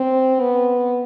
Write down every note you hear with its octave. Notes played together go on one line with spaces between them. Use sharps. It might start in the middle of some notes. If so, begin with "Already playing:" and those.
Already playing: C4
B3